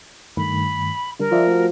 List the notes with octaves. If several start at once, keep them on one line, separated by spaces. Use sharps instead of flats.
G2 D#3 A3 B5
D3 G3 D4 A#4
F3 C5 D5 E5
A3 F#4